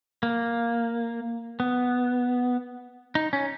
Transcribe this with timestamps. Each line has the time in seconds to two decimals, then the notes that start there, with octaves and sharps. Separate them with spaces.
0.23 A#3
1.60 B3
3.15 D#4
3.33 C#4